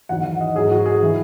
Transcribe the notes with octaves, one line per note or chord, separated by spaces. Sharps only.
E2 D#3 F#3 F#5
F#5
D#5
G#2 F#3 G#4
F#4
G#4
E3